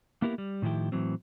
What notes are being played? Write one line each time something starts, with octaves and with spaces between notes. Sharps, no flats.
A#3 B3 E4 G4 A#4
G3
A2 D#3 F3 E4 G4
A2 E3 F#3 C4